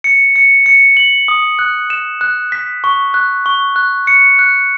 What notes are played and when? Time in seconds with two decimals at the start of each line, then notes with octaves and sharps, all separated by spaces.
0.04 C#7
0.36 C#7
0.66 C#7
0.97 F#7
1.28 D#6
1.59 F#6
1.90 E7
2.21 F#6
2.52 B6
2.84 C#6
3.14 F#6
3.46 C#6
3.76 F#6
4.07 C#7
4.39 F#6